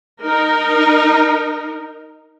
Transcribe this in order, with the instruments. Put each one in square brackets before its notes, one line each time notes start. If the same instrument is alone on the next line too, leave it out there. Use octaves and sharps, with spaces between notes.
[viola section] D#4 A#4